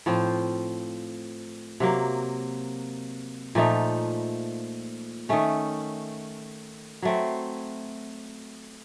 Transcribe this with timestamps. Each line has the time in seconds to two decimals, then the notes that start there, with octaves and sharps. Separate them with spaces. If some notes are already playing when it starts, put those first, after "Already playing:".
0.06 A2 F3 C4
1.80 C3 F#3 A#3
3.55 A#2 F3 A3 D#4
5.29 D#3 A3 C#4
7.02 F#3 A3 C4